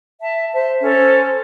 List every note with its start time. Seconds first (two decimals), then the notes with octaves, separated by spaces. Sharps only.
0.21 E5 A5
0.53 C5 E5 A5
0.82 C#4 A4 C5